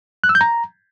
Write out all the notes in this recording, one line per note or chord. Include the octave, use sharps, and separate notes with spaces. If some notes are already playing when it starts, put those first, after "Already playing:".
F#6
E6
G6
A#5